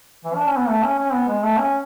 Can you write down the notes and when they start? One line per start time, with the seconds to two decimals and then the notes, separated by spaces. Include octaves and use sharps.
0.24 E3
0.35 D4
0.46 C#4
0.57 B3
0.68 A3
0.83 C#4
0.98 C#4
1.13 B3
1.28 G#3
1.43 A3
1.57 C#4